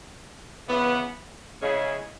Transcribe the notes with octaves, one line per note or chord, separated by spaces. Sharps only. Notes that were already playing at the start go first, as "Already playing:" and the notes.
C#3 E3 B3
C#3 G#3 C#4 E4 G#4